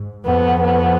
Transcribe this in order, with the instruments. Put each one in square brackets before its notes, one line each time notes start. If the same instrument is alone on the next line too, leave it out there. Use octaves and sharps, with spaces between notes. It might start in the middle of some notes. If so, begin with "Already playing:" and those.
Already playing: [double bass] G#2
[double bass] F2 [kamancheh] B3
[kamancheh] B3